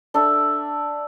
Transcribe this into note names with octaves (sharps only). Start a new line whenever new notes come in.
D4 A4 E5